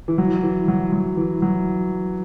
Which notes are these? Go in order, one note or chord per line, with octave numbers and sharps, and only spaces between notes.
E3
F#3
E3
F#3
F#3
E3
F#3